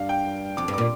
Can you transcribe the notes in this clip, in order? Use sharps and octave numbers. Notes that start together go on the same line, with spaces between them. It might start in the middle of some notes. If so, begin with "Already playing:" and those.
Already playing: G2 F5
G5
F2 D6
G2
A#2 D6